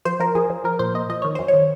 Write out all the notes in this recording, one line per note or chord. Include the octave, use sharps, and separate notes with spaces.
F3 C5
F3 A#4
F3 G#4
F3
F3 A#4
A#2 C5
A#2 D#5
F3 D#5
D#3 C#5
F#2 C5
C#5
D#3